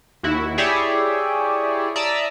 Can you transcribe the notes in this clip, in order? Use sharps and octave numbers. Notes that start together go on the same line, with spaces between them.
D#2 E4 F#4
E4 G4 G#4 C#5 D5 E5
D5 E5 A5 A#5 D#6 E6